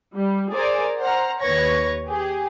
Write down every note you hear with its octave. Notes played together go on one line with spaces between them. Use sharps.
G3
G#4 A#4 C5 D5 G#5
C5 F#5 A#5 F6
D#2 B4 C#5 C#6 G#6 A#6
G4 G#4